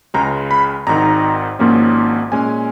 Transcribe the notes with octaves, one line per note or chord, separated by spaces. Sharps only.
C#2 C#3 G#3 A#5
B5
G#1 G#2 D#3 A#5
G#1 G#2 F3 A#3 C#4
A#2 G#3 C#4 G#5